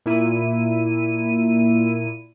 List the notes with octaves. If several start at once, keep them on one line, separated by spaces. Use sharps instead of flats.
A#2 E4 D#7